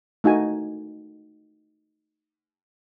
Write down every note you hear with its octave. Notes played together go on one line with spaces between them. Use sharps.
A3 D#4 F#4 G#5